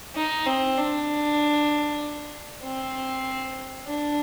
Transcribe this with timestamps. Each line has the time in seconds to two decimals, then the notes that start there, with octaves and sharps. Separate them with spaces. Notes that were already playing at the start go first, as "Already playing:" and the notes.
0.15 D#4
0.46 C4
0.77 D4
2.63 C4
3.87 D4